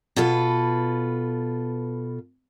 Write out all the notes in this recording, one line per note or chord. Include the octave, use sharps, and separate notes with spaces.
B2 F4 A4 B4